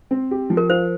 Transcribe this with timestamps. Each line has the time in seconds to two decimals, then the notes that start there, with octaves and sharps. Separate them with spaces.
0.11 C4
0.31 G4
0.50 F3
0.57 A#4
0.69 F4 C5